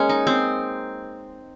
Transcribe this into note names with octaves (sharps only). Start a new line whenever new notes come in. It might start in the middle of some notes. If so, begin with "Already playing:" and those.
Already playing: G#3 A#3 C#4
D#4
C4